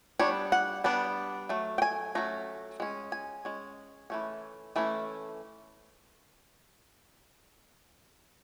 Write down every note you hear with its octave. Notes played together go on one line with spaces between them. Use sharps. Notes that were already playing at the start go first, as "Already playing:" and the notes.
G3 B3 D4 C#5
F#5
G3 B3 D4
F#3 A3
G5
G#5
F#3 A3 C#4 A#5
G#3 C#4
G#5
G#3 C#4
E3 A3 C#4
E3 A3 C#4